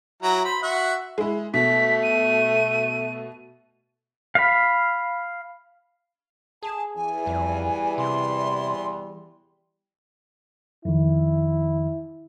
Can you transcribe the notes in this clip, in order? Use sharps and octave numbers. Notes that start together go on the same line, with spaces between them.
F#3 E4 A#5
C5 B5
F#4 E5 F#5
G#3 E4
B2 A3 B6
D#7
F5 B5
G#4 A5
E2 E3 G#5
F2 G3
C3 C6
F2 D#3 E4